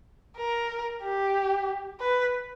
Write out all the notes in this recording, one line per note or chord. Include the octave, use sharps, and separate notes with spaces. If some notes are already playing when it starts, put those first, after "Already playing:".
A#4
G4
B4